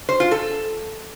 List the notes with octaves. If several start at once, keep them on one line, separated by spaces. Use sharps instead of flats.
C5
F4
A4